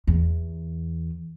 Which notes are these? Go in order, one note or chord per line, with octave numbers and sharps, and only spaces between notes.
E2